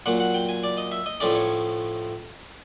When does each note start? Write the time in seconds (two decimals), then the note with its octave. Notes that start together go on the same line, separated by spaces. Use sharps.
0.06 A#2 F#3 A#3 F#5
0.20 F#5
0.35 G5
0.49 G#5
0.64 D5
0.78 D#5
0.92 E5
1.06 D#5
1.20 A2 F3 A3 C#4 D5
1.35 C#5